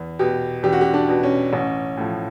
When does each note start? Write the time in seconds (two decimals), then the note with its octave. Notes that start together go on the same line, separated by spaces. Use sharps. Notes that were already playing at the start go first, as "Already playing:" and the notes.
Already playing: E2
0.19 B2 G4
0.63 E2 G4
0.73 F#4
0.81 G4
0.94 D4
1.09 B2
1.23 C#4
1.53 A1 C#4
1.97 A2 F3